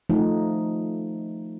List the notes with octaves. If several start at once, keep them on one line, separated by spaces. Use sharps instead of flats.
F3 A3 D#4